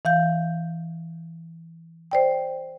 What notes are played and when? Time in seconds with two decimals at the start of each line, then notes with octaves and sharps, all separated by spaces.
0.05 E3 F5 G6
2.11 C5 D5 G5